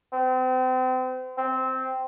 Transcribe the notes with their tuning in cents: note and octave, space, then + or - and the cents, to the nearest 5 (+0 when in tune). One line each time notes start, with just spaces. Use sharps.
C4 -35
C4 -10